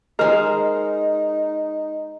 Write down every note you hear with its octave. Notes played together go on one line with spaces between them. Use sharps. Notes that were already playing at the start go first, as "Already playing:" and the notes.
G#3 D#4 A#4 C5 D#5